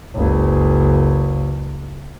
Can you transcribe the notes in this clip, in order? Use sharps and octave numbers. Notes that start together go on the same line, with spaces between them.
F#1 C#2